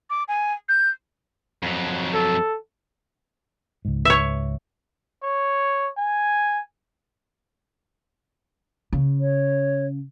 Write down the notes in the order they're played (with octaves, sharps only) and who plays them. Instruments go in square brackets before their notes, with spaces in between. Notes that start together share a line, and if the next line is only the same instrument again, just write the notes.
[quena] D6
G#5
G6
[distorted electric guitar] F2 F#3
[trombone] A4
[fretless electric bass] C#2 G#2
[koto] C#5 E5
[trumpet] C#5
G#5
[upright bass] C#3
[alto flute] C#5